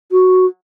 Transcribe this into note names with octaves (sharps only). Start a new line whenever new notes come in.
F#4